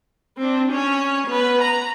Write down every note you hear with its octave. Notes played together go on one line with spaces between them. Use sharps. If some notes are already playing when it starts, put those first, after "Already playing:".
C4 D4
C#4 C#5
B3 B4
A#5